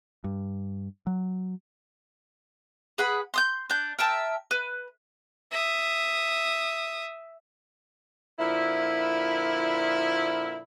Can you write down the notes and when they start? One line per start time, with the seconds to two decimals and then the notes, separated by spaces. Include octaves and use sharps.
0.24 G2
1.07 F#3
2.98 G#4 B4 F#5 B5
3.34 C6 D#6 G6
3.70 D4 G6
3.99 A#4 E5 G5 A5
4.51 B4
5.51 E5 D#6
8.39 A#2 D3 F3 E4